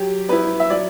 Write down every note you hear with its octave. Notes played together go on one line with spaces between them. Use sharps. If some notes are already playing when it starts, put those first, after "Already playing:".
Already playing: F#3 G4
B3 E4 B4
E5
F#3 D5